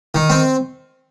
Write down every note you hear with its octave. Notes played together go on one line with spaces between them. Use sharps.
D#3
C4